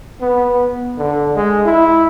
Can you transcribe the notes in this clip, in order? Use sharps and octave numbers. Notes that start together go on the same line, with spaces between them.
B3
D3
G#3
E4